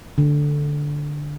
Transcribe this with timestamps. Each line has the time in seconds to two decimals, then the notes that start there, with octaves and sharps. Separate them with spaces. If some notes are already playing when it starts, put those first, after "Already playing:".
0.18 D3